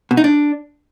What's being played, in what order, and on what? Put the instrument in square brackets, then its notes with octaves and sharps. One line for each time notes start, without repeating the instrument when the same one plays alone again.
[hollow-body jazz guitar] B2
D#4
D4